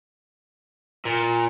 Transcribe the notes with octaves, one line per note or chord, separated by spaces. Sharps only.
A#2